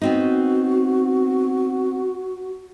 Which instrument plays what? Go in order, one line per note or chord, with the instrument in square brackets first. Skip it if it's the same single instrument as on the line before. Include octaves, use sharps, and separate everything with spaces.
[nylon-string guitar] B3 C4 D#4 [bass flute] F#4